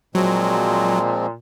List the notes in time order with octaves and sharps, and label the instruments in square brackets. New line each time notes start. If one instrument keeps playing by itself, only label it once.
[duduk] A#2 [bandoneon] F3 G#3 C4 [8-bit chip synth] F#3